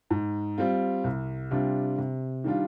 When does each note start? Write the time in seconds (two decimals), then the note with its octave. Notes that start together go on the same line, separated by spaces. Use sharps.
0.10 G#2
0.58 G3 C4 F4
1.04 C2
1.51 C3 G3 D4 F4
1.98 C3
2.44 D#3 G3 D4 F4